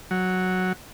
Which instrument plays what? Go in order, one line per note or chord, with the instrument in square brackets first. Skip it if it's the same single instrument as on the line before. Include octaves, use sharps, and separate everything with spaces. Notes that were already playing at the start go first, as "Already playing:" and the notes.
[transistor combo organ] F#3